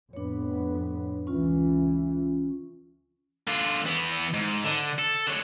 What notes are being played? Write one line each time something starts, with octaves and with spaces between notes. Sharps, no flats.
F2 A2 B3 D4 C#5
C#2 E3 C#4 F4
D3 F4
E3 B3
G#2
D3
A4
D3 C#5